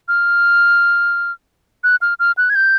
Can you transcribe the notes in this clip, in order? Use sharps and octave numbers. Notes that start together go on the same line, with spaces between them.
F6
F#6
F6
F6
F#6
G#6
G6